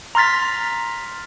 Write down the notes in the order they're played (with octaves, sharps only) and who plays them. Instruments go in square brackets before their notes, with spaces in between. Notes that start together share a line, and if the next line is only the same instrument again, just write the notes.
[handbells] A#5 C6 F6 A6 B6